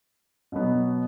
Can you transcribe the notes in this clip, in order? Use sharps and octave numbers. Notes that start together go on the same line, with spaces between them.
B2 F#3 B3